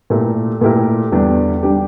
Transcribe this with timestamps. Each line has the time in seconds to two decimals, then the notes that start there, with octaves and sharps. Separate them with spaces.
0.10 A#2 A3 E4 G4 A#4
0.61 A#2 A3 E4 G4 A#4
1.12 E2 D3 G3 D4 G4
1.63 D3 G3 D4 G4